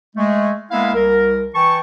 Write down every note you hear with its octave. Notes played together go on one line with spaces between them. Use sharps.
G#3 A3
G#3 A#3 B3 E4 E5 F5
C2 A#4
E3 G5 A5 C#6